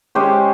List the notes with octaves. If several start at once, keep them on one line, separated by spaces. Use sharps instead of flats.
G#3 C#4 G4 C5